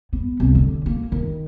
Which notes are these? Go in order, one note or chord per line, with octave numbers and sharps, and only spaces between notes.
B3
C2
D3
A#3
D#3